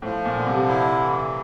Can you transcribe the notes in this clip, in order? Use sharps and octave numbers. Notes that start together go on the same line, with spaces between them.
A2 F3
A#2
D3
C3
E4
E3